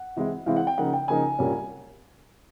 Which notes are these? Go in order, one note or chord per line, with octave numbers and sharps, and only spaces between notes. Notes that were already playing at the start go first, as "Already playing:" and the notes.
Already playing: F#5
C3 E3 G#3 C4 E4
C3 E3 G#3 C4 E4 F5
F#5
G5
C#3 F3 A#3 D#4 F#5
G5
C#3 F3 A#3 D#4 G#5
C2 A#2 G3 A#3 C#4